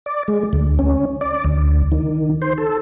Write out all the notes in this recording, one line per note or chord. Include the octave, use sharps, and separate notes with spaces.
D5
G#3
D2
C#4
D5
D2
D#3
C5
A4